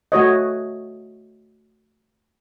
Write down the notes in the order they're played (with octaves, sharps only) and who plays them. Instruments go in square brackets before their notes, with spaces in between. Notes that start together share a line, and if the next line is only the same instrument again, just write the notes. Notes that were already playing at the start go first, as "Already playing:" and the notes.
[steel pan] A3 F#4 C#5 D#5